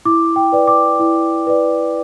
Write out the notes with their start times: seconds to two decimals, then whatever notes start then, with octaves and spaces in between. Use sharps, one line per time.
0.05 E4 D6
0.36 G5
0.52 B4 D5
0.67 D6
1.00 E4
1.47 B4 D5